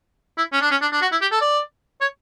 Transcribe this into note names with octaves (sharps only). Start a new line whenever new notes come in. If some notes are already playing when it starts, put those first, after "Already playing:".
E4
C#4
D4
C#4
D4
D4
F#4
E4
G4
A4
D5
C#5